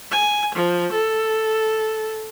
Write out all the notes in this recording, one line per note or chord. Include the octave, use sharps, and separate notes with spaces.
G#5
F3
A4